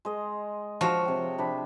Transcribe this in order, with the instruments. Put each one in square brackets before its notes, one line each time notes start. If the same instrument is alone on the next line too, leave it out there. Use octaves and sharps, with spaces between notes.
[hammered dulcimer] G#3 D#5
[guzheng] F3 [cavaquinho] F#4 C#5
[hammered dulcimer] C3 G5
C3 D4 B5